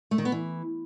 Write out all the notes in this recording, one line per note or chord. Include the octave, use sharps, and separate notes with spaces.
A3
D#3
B3
E3